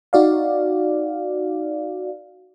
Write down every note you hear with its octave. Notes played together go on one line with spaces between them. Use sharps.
D#4 F#4 D5 F5